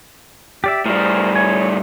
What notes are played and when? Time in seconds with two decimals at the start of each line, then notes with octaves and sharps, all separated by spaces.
0.64 G4 D5 E5
0.86 A2 G3 G#4 A#4 C5
1.36 C#5 G#5